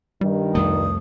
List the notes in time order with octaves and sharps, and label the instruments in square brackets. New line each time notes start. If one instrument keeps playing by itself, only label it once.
[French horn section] G2 D#3 [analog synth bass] G3
[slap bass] C2 F2 A3 [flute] D#6